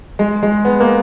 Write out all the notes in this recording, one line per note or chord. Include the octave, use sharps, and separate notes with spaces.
G#3
G#3
B3
A#3